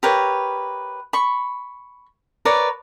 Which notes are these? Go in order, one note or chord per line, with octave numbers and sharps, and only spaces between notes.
G4 A#4 B4 C#5
B5 C#6
A#4 B4 C#5 D5